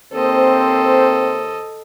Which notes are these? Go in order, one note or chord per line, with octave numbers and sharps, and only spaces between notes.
D#2 A#3 C4 A4 C5 D#5